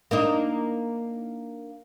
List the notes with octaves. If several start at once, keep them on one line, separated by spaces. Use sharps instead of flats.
A#3 D4 D#4